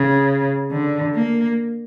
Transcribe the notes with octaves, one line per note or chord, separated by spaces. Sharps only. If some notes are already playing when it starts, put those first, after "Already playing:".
Already playing: C#3
D3
A#3